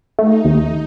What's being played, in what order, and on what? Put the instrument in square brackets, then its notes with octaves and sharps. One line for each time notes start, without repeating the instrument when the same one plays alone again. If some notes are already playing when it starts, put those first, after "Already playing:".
[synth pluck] A3 [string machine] D#4
[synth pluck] D#2